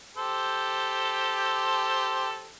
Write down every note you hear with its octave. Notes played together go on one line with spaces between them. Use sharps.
G4 A4 C5